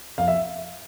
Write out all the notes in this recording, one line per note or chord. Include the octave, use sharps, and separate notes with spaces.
F2 F5
E5